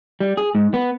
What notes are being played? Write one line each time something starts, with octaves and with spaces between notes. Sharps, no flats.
G3
G#4
G#2
B3